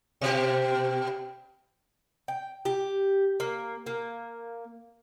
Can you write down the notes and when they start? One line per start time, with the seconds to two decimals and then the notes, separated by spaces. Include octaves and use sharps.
0.21 B2 G4
2.28 G5
2.65 G4
3.40 A#3
3.86 A#3